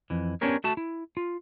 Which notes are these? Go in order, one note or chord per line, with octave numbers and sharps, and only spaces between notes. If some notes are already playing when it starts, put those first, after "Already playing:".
F2 E3
B3 C#4 D4 G4 A#4 C#5
A3 F#4 A5
E4
F4